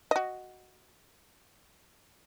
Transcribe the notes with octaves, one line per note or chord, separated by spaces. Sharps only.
F#4 D#5